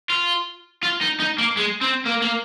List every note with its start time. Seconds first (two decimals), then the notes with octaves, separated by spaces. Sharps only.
0.10 F4
0.83 F4
1.01 D#4
1.20 D#4
1.38 A#3
1.57 G#3
1.82 C4
2.06 A#3
2.22 A#3